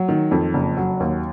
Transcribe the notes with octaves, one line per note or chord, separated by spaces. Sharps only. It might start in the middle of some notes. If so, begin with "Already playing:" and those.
Already playing: F#3
D#3
F2
F#1
F#3
D#2